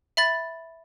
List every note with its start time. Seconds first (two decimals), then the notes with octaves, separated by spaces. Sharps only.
0.17 E5 B5 A6